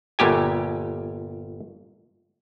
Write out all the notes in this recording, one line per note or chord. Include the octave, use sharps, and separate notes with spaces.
G1 A#2 G4 G#5